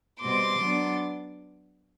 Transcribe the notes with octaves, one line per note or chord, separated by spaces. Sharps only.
B2 G3 C4 C6 D6
F#3 B3 D4